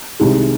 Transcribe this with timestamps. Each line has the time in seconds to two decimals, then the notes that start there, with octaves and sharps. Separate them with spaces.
0.19 C2 C3 D#3 G#3